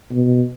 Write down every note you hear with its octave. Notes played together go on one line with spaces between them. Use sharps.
B2